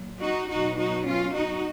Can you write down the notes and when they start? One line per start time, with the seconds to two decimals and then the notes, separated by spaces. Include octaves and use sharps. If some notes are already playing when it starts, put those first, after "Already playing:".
Already playing: A#2 F#3
0.22 D#4 F#4
0.50 B2 F#3 D#4 F#4
0.78 D#4 F#4
1.06 C#4 F4
1.35 D#4 F#4